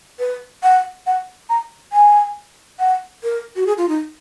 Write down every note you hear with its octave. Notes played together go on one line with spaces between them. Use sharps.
B4
F#5
F#5
A#5
G#5
F#5
A#4
F#4
G#4
F4
D#4